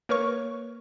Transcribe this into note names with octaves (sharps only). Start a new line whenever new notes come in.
A#3 A#4 B4 C#5 C#6